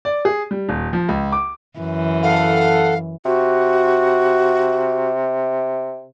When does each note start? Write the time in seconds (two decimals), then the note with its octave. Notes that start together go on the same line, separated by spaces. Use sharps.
0.05 D5
0.25 G#4
0.51 G3
0.69 D#1
0.93 F3
1.09 C#2
1.32 D6
1.79 F#2 E3
2.23 A4 F5 F#5
3.25 C3 F#4